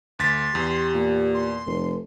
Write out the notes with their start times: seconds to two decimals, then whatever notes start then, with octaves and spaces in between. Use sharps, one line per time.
0.19 D2 C6 A6 B6
0.55 E2 G4
0.94 A#2
1.34 C6
1.66 F1